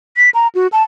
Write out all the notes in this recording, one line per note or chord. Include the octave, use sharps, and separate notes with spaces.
B6
A#5
F#4
A5